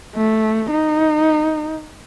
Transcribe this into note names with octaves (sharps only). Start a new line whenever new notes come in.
A3
D#4